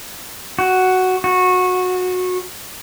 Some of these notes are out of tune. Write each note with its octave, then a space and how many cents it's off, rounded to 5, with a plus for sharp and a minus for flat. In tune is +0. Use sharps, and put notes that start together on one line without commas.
F#4 +5
F#4 -20